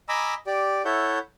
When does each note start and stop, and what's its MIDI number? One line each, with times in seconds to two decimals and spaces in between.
0.09 0.34 75
0.09 0.34 80
0.09 0.34 82
0.09 0.34 83
0.09 0.34 86
0.09 0.34 88
0.47 0.82 67
0.47 0.82 74
0.85 1.19 64
0.85 1.19 69
0.85 1.19 73
0.85 1.19 76
0.85 1.19 78
0.85 1.19 91